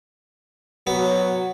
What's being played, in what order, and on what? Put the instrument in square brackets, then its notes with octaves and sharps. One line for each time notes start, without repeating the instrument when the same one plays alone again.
[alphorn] F#3 [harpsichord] B3